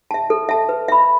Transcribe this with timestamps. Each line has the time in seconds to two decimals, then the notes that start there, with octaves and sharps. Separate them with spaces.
0.11 E5 A5
0.30 A4
0.49 E5 A5
0.69 B4
0.88 E5 B5